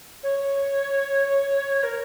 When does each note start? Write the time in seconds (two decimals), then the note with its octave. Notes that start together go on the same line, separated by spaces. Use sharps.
0.23 C#5
1.82 A#4